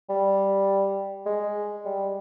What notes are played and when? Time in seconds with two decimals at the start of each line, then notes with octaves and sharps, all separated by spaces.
0.09 G3
1.26 G#3
1.85 G3